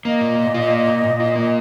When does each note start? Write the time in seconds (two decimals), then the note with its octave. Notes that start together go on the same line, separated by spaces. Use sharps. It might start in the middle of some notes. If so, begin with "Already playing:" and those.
0.05 A#3 D#5
0.21 A#2
0.38 A#2
0.54 F4
0.71 A#3
0.87 A#2
1.04 A#2
1.20 F4
1.36 A#3